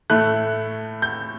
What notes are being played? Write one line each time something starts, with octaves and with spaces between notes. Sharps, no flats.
A2 A3 F#6
G6